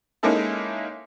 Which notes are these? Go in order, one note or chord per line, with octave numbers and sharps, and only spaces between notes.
G#3 A#3 C#4 D#4 E4 A4